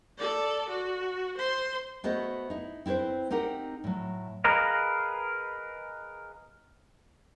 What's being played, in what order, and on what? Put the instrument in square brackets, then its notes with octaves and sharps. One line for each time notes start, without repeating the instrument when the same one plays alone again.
[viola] A4 D5
F#4
C5 C6
[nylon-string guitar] A3 B3 F#4 A4 C5 D#5
D#4 E4
C4 E4 G4 B4 C5
C4 D#4 G4 A#4 F#5
A2 F#3
[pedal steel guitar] G#4 A#4 B4 D#5 F5